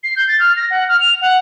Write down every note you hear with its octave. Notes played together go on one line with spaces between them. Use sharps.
C7
G6
A6
F6
A#6
F#5
F6
F7
F#5